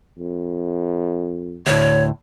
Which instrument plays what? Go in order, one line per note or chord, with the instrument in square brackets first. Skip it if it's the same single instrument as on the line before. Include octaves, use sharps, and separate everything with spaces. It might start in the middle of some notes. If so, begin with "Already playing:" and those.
[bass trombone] F2
[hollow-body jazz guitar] D2 A2 [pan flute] C#5